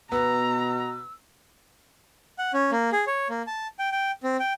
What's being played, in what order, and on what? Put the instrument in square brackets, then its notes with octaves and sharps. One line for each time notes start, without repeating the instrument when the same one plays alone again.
[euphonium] B2 [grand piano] B3 [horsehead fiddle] A#5 [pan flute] E6
[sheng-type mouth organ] F#5
C#4
A#3
G#4
C#5
A#3
A5
G5
G5
C4
G5